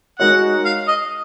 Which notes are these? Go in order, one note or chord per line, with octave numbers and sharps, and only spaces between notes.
G#3 D#4 F#4 A#4 C#5 F#5
F5
D#5